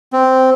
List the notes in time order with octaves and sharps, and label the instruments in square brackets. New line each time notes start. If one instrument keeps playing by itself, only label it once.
[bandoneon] C4